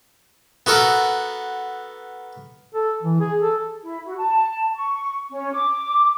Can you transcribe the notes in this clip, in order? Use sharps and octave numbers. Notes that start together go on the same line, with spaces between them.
B3 F#4 A4 A#4
A4
E3
G#4
A4
E4
F#4
A5
C#6
C#4
D6